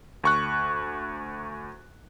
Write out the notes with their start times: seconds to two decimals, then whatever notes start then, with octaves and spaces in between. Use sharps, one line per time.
0.24 D2 C#6 F#6